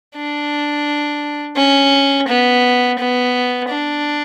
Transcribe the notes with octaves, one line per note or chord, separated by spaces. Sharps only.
D4
C#4
B3
B3
D4